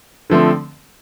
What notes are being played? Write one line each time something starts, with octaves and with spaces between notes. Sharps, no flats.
D3 F3 A3 C4